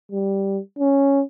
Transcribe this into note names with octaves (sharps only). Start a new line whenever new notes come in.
G3
C#4